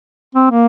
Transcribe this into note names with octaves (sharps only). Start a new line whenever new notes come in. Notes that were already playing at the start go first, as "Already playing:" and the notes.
C4
A#3